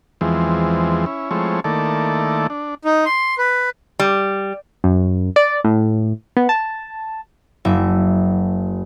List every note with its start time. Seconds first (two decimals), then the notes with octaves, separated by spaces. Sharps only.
0.21 E2 E3 F3 G#3 C4
1.06 C#4 E4
1.31 F3 G#3 A3 C4 E4 C#5
1.64 D#3 A3 A#3 E4 A4 D5
2.50 D4
2.85 D#4
3.06 C6
3.38 B4
3.99 G3
4.84 F#2
5.36 D5
5.64 A2
6.37 B3
6.49 A5
7.65 F#1 E5